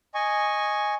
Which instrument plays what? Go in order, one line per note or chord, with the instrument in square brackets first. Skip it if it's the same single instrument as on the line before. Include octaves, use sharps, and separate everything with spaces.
[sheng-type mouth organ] D#5 G#5 C#6